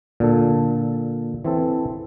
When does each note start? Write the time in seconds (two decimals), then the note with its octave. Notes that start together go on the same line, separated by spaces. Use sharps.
0.20 A#2 D3 A4
1.45 E3 C4 A4